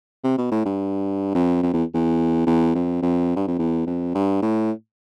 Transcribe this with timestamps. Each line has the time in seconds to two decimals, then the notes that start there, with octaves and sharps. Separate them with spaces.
0.24 C3
0.38 B2
0.52 A2
0.66 G2
1.35 F2
1.62 F2
1.73 E2
1.94 E2
2.46 E2
2.75 F2
3.02 F2
3.36 G2
3.47 F2
3.59 E2
3.86 F2
4.15 G2
4.42 A2